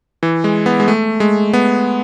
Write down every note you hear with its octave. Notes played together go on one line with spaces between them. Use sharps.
E3
G#3
B3
G#3
A3
G#3
B3